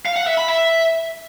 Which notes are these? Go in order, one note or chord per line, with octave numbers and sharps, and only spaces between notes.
F5
F#5
E5
B5
E5